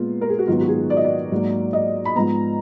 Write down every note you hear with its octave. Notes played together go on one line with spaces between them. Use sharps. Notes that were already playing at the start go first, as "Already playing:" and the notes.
Already playing: A#2 G#3 B3 F4
A#4
G#4
F#4
G#2 D#3 F#3 B3 F4
F#4
G#4
D5
D#5
D5
G#2 F#3 A#3
D#5
B5
G#2 F3 B3 A#5